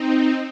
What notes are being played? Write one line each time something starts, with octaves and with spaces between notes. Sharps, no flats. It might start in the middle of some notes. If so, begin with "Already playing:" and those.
Already playing: C4 D#4